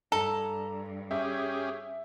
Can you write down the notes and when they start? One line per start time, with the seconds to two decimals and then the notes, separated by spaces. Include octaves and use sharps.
0.12 G2 A4 A#5
1.11 C#4 G4 G#4 E5